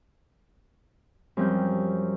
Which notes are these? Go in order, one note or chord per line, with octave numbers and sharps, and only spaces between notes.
F#2 F3 G3 C4 G6